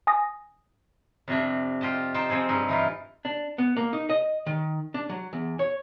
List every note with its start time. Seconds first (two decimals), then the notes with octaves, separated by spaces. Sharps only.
0.07 G#5 D#6 A#6
1.28 F2 C3 D4
1.81 F4 G4 D#5 A5
2.14 D#4 C5 G5 A5
2.29 F3 C4 G#4 A4
2.49 G2 D#4
2.69 E3 D#4 F4
3.25 D4
3.58 B3
3.77 A#3
3.93 D#4
4.10 D#5
4.46 D#3
4.94 D4
5.09 F#3
5.33 E2
5.59 C#5